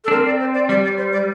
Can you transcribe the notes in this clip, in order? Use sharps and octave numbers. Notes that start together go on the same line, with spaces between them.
A4
D4
C4 A#4
D5
C5
D5
G3 D5
D5
C5
D5